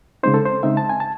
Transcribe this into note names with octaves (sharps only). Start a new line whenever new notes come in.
C#3 G#3 C4 D#4 C5
A4
C5
C#3 G#3 C4 D#4 E5
A5
G#5
A5